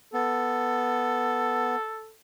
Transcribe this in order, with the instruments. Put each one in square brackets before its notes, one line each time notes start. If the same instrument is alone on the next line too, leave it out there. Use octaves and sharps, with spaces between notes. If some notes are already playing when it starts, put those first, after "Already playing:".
[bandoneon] B3 [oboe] A4